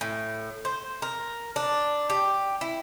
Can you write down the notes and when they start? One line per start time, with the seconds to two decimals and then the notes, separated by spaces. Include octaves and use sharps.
0.01 A2
0.65 C5
1.02 A#4
1.56 D4
2.10 G4
2.61 E4